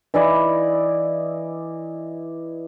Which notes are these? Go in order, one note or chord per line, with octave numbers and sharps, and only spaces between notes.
E3 E4 D5 D#5